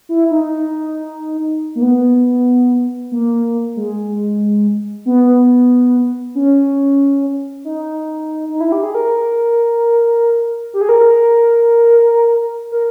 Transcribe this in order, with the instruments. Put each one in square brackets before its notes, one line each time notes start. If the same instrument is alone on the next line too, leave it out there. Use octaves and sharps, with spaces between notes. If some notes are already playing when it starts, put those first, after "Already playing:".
[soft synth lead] E4
D#4
A#3
B3
A#3
G#3
B3
C#4
D#4
D#4
E4
G4
G#4
A#4
G4
G#4
A#4
A#4